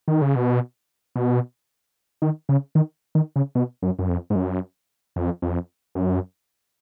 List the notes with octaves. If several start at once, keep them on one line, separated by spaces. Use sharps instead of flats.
D#3
C#3
B2
B2
D#3
C#3
D#3
D#3
C#3
B2
F#2
F#2
F2
G#2
F#2
F2
F2
F#2